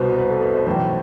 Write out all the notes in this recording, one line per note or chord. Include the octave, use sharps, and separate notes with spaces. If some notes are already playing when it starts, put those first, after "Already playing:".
Already playing: C2 B2 B4 C5
B4
A4
B4
C5
B1 A2 E3 C5